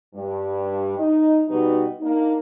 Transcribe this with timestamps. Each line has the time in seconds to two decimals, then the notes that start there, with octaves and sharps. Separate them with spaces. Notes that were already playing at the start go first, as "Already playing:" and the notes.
0.14 G2
0.98 D#4 D#5
1.48 B2 G3 D#4 F#4 B4
1.99 A#3 D4 D#4